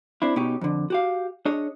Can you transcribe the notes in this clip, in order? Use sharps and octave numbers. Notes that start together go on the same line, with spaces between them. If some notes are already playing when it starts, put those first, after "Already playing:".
C4 D4 E4
B2 C#4 D#4 G4
F2 D3
F#4 G4 F5
D4 G#4 C#5 D#5